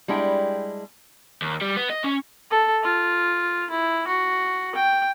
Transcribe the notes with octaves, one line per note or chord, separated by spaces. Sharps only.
G3 G#3 D4 E4 G5
D#2
G3
B3
D#5
C#4
A4
F4
E4
F#4
G5